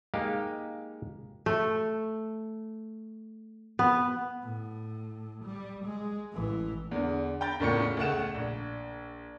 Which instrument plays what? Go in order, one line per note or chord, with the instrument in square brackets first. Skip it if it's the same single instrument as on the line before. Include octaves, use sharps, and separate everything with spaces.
[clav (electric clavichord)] G#3 A#3 D#4 G4 F5
[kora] A3
B3
[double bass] A2
G3
G#3
A1 E3
[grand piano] E2 D3
G5 A#5 B5 G6 A6
F#1 E2 A2 F4 C#6 C#7
C#2 A3 F#5 E7
A#1